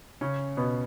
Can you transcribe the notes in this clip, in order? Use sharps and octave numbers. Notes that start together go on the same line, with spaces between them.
C#3 C#4
B2 B3